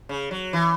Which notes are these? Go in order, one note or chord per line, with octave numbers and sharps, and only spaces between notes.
C#3
F#3
E3